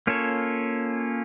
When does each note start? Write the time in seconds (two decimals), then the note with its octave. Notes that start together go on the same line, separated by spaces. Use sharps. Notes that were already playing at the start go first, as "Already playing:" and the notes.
0.07 A#3 C#4 F4 A4 C#5